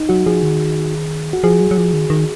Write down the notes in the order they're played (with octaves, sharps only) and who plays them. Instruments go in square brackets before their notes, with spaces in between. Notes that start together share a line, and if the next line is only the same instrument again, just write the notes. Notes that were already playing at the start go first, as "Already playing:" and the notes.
Already playing: [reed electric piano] D#4
[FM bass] F#3 [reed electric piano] F#4
[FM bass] F3 [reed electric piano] G#4
[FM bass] D#3
[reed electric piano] F#4
[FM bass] F3 [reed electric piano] G#4
[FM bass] F#3
F#3
F3
D#3
D#3